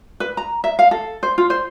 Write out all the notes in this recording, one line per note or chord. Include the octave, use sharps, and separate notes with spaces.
B4
A#5
E5
F5
A4
C5
F4
C5